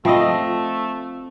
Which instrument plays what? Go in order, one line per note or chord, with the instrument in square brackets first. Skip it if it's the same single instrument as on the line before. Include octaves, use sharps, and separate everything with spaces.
[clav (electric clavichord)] F3 [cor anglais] A3 [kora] C4 D#5 [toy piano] F4 E5 D#6